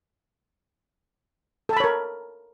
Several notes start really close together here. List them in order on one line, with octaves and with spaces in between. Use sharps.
A4 A5 B5 C#5 A#4